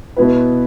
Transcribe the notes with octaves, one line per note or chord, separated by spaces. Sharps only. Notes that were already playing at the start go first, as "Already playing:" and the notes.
B2 B3 E4 B4